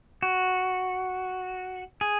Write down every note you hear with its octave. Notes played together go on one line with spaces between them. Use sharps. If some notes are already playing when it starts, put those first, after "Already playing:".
F#4
G#4